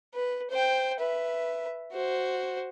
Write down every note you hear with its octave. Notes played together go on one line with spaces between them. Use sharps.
B4
C5 G5
B4 E5
F#4 C5